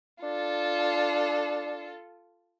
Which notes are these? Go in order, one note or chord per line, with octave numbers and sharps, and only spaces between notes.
D4 F4 A4